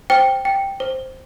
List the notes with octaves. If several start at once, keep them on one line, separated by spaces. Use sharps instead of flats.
C5 G5
G5
C5